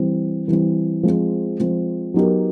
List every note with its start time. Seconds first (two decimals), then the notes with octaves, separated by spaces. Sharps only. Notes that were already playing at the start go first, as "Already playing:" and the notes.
Already playing: E3 G3 C4
0.48 E3 G3 C4
1.03 F3 G#3 C4
1.60 F3 G#3 C4
2.14 F#3 B3 D#4 G4 A#4